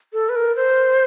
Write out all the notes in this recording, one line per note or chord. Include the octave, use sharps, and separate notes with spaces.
A4
B4
A#4
C5